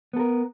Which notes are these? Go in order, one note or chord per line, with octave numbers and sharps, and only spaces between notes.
B3 A4 A#4